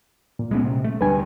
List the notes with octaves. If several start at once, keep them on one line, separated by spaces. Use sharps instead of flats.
A#2
G#3 B3 C#4
C3
A3
D2 G3 D4 B4 G#5